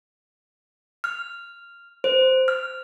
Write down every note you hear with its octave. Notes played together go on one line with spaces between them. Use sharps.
F6
C5
F6